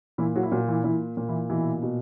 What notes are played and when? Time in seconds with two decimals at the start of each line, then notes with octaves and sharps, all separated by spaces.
0.18 A#2 E3 E4
0.36 F#3 F#4
0.43 E4
0.51 A#2 F#3 F#4
0.67 E3 E4
0.84 A#2 E3 E4
1.17 A#2
1.29 E3 E4
1.50 B2 E3 E4
1.82 B2